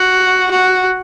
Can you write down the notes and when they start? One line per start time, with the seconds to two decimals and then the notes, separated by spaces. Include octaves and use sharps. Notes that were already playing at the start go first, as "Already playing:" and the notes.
Already playing: F#4
0.51 F#4